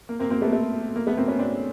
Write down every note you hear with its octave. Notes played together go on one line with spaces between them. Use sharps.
A#3
A#3 C4
A#3 C4
A3 B3
A3
A#3
A3 B3
A#3 C4
B3 C#4
C4 D4